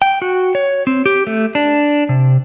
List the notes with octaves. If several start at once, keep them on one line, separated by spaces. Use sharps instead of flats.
G5
F#4
C#5
C4
G4
A3
D4
C3